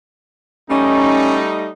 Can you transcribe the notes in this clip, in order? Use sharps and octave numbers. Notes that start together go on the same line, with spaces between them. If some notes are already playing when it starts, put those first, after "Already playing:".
G3 A3 C#4 D#4